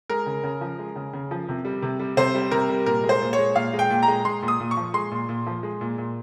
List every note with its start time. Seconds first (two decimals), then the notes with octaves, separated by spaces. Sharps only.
0.09 G#3 A#4
0.26 C#3
0.44 C#3
0.61 F3
0.79 G#3
0.96 C#3
1.13 C#3
1.31 F3
1.49 C3
1.65 G3
1.82 C3
1.99 G3
2.17 C3 C5
2.35 G3
2.51 C3 A#4
2.69 G3
2.86 A#2 A#4
3.04 G#3
3.09 C5
3.22 A#2
3.33 C#5
3.39 G#3
3.55 A#2 F5
3.74 G#3
3.79 G5
3.90 A#2
4.02 A#5
4.08 G#3
4.25 G#3 C6
4.42 A#2
4.48 D#6
4.60 A#2
4.71 C#6
4.77 F3
4.94 G#3 C6
5.11 A#2
5.29 A#2
5.46 F3
5.63 G#3
5.81 A#2
5.98 A#2